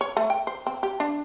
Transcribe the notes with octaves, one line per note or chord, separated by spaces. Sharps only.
C#5
A3
G5
C5
C4
G4
D4